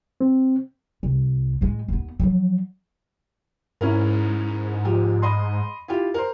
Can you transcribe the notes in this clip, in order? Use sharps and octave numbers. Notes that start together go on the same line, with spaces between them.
C4
C2
A2 G#3
D#2 B3
F3 F#3
G#2 C#4 E4 A#4
F3 G4
D#5 B5 C6
E4 F4 G4
A#4 C5